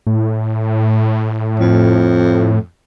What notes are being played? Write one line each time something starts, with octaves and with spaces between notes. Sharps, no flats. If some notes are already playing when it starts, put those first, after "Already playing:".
A2
F2